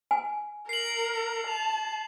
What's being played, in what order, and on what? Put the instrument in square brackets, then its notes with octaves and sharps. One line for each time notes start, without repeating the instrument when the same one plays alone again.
[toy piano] G#5
[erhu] A#4 [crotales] C7 F#7
[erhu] A5 [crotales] F7